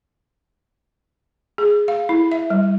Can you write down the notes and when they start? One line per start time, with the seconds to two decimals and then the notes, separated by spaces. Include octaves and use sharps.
1.58 G#4
1.88 F5
2.09 E4
2.32 E5
2.50 G3